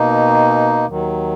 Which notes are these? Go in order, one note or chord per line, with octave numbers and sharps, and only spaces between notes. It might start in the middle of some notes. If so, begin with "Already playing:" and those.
Already playing: B2 A#3 D#4
D#2 D#3 F#3